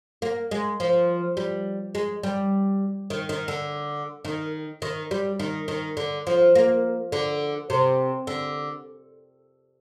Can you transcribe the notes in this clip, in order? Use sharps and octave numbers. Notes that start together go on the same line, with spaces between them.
A#3
G#3
F3
G3
G#3
G3
D#3
D#3
D3
D#3
D#3
G3
D#3
D#3
D3
F3
A#3
D3
C3
D3